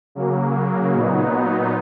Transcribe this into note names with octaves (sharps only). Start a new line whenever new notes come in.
C#3 F#3 A#3
A#2 F#3 B3 D#4